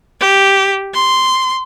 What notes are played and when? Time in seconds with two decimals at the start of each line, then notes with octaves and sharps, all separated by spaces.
0.20 G4
0.94 C6